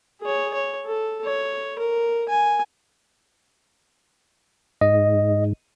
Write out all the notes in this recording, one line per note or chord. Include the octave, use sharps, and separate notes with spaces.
G#4 C#5
C#5
A4
C#5
A#4
G#5
G#2 D#5